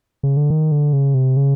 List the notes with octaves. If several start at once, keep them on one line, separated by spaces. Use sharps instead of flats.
C#3
D3
D#3
D3
C#3
C3
C#3